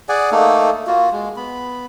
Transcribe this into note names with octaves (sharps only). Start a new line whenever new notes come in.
G#4 D5 F#5 G#5
A3 A#3 D#4 A4
A#3 F4 F#4
G#3
B3 B5